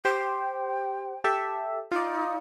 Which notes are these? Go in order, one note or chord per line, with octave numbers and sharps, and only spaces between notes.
G4 C5 G5
G4 A4 E5
D#4 F4 D5